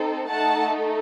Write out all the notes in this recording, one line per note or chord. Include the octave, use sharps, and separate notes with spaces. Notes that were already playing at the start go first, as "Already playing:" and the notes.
Already playing: C4 D#4 A4
A3 D#4 A4 F#5 A5